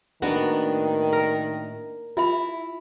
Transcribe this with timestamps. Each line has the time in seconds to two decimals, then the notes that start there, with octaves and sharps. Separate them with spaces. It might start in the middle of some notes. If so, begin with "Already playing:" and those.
0.22 A2 D#3 A#3 B3 D4 F#4
1.13 A#4
2.17 E4 F4 E5 B5